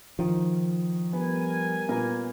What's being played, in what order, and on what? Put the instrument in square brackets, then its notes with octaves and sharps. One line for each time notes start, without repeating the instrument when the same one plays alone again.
[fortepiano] D#3 [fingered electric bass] F3
[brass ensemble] G3 A#4 G#5 [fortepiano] B3
[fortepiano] A#2 A#3 B3